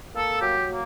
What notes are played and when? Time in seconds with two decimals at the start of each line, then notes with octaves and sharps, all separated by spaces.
0.15 A#3 A4
0.42 F#3 G4
0.69 A#3